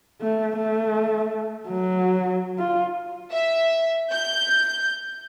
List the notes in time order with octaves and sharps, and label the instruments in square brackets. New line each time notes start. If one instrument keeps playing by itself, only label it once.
[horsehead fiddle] A3
A3
F#3
F4
[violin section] E5
G6